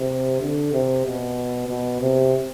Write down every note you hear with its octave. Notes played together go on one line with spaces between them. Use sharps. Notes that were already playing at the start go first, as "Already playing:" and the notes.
Already playing: C3
D3
C3
B2
B2
C3